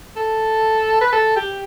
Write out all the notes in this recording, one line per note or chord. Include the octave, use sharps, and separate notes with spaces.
A4
B4
A4
G4